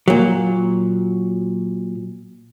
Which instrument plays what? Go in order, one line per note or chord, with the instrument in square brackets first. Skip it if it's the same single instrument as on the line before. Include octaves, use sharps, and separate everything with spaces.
[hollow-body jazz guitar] A#2 F#3